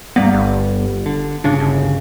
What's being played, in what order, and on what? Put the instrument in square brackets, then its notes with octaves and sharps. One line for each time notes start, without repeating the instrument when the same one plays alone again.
[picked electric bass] G2 G3 B3 [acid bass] A#3
[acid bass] G1
[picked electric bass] D3
[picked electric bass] G1 C#3 [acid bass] D4
[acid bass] F#1